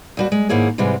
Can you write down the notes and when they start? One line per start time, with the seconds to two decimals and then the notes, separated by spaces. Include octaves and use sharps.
0.17 D#2 G3 F#4
0.32 G#3
0.49 G#2 D#3 A#3 E4 G#4 C#5
0.78 G#2 C3 E3 G3 G#3